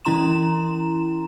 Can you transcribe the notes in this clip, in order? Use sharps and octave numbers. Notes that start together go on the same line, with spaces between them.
E3 C#4 E4 A#5 C6 E7